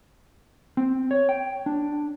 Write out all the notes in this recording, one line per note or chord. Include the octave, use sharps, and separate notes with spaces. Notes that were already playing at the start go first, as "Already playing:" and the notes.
C4
C#5
G5
D4